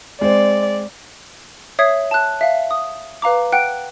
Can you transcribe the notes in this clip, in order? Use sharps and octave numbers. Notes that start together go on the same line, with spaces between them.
G#3 C4 D5
C#5 E5 D#6 G#6 C7
A5 F#6
E5 F5
D#6
B4 F5 A#5 D6
F#5 G5 F#6 D7